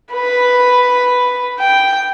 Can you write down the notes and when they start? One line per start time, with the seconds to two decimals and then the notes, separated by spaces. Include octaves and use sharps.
0.12 B4
1.59 G5